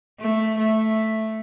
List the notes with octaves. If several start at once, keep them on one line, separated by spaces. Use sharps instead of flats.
A3
A3